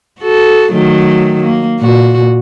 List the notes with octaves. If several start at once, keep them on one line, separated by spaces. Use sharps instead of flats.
F#4 A4
D#3 F#3 A3
A#3
A#2 F#4